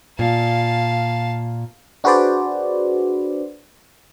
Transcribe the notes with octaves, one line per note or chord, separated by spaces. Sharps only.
A#2 F5 A5
D4 F#4 G#4 B4 C5 D5